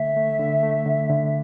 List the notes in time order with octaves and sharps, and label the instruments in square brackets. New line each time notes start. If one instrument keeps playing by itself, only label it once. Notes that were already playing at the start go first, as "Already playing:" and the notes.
Already playing: [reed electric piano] D3 A3 [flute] E5
[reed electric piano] A3
D3
A3
D3
D3